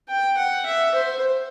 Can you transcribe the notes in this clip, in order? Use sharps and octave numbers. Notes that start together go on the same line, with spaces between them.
G5
F#5
E5
C5